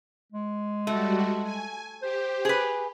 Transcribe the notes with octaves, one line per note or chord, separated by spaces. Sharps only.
G#3
G3 A3 F#4
G#5
G4 C5
G#4 B4